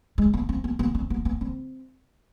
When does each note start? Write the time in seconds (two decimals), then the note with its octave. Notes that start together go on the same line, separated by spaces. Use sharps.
0.18 G#3
0.34 B3
0.49 C4
0.64 B3
0.79 B3
0.95 C4
1.10 B3
1.25 B3
1.41 C4